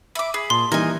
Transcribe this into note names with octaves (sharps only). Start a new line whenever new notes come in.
E5 B5 D6
G#4 B5
A#2 A5 C6
E3 G3 A#3 D#4 A#4 G#5